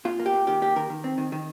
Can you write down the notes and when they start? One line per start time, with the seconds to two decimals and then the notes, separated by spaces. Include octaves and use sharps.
0.05 A#2 F4
0.19 A#3
0.26 G4
0.33 A#2
0.47 D#3 G4
0.62 A#3 G4
0.76 D#3 A#4
0.90 D#3
1.04 C4
1.18 D#3
1.32 D#3